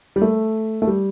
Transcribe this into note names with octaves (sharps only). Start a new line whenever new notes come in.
G3
A3
A3
G3